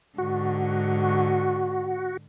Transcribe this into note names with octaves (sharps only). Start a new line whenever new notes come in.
G#2 D3 F#4